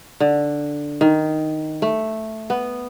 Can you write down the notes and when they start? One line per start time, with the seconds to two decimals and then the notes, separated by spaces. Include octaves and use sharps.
0.20 D3
1.01 D#3
1.82 A3
2.50 B3